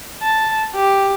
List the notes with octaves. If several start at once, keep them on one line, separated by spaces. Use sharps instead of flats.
A5
G4